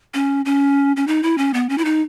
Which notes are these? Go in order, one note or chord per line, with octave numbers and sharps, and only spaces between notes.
C#4
C#4
C#4
D#4
E4
C#4
B3
C#4
E4
D#4